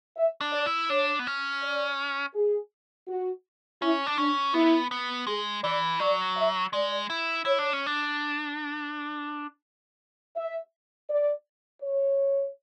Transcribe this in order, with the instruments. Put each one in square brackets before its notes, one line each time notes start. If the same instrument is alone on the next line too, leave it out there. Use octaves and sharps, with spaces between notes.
[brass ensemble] E5
[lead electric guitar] D4
[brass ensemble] D5
[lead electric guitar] E4
[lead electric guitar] D4 [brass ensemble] C#5
[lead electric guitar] B3
C#4
[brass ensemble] D5
G#4
F#4
[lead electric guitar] C#4 [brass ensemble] E4
[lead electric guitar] D4
[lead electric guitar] C#4 [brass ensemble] D4
[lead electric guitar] B3 [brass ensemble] E4
[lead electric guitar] B3
[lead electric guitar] G#3 [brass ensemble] G#4
[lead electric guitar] E3 [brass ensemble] D5
[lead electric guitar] F#3 [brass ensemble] D5
[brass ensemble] E5
[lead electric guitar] G#3 [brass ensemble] D5
[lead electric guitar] E4
[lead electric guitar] E4 [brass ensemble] C#5
[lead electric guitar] D4
C#4
D4
[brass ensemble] E5
D5
C#5